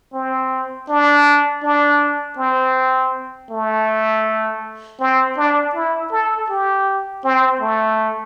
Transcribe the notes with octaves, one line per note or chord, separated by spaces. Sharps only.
C4
D4
D4
C4
A3
C4
D4
E4
A4
G4
C4
A3